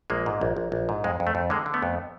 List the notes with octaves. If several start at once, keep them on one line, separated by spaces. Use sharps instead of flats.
A#1 G#3 A#3
G#2
A#1
A#1
A#1
G#2
F2 G#3
F2
A3
F2
D3 G#3 A#3
D3
A3 B3
F2